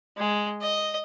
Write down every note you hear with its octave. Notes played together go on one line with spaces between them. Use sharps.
G#3
D#5